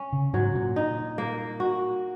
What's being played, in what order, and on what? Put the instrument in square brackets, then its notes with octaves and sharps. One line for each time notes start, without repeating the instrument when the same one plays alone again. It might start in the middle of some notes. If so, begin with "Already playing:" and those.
Already playing: [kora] C#4
[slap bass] C#3
[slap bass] G#2 [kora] F#3
[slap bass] A#2
[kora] D#4
A#3
F#4